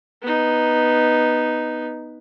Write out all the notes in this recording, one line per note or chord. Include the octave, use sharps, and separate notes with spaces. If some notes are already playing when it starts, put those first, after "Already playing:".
B3 D#4